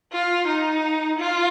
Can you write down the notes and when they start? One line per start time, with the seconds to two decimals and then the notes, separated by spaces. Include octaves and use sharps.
0.13 F4
0.47 D#4
1.18 F4